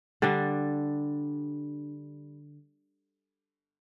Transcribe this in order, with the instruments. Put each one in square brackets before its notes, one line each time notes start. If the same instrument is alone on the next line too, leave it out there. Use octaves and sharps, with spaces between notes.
[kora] D3 G3 D4